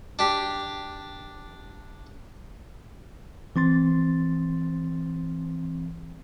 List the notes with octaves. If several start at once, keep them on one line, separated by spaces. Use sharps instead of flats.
D4 G4
E3 C4 C6 A6